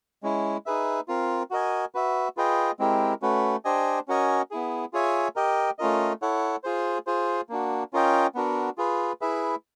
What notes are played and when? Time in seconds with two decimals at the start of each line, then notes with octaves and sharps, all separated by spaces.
0.23 G#3 C#4 E4
0.66 D#4 G#4 B4 E5
1.08 C4 F4 A#4
1.51 F#4 A#4 D#5 G#5
1.95 F#4 B4 E5
2.37 F4 G#4 B4 D#5 G5
2.79 G#3 C4 E4 G4 A#4
3.22 A3 C#4 F#4 B4
3.65 D4 G4 C5 D#5 G#5
4.08 C#4 F#4 A#4 D#5 G#5
4.51 B3 E4 G#4
4.93 F4 G#4 C#5 E5 G#5
5.36 G4 A#4 D#5 G5
5.79 A3 C#4 F4 A#4 D#5
6.22 E4 A4 C#5 F#5
6.64 F4 G#4 C5
7.07 F4 G#4 C5
7.49 A#3 D4 F#4
7.93 C#4 F4 A#4 D#5 G5
8.35 B3 D4 F#4 A#4
8.78 F4 G#4 B4
9.21 E4 G#4 B4 E5